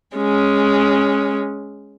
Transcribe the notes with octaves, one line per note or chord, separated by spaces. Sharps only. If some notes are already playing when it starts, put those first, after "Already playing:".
G#3 C#4